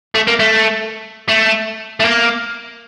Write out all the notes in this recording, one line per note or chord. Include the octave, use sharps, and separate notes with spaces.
A3
A#3
A3
A3
A3
A#3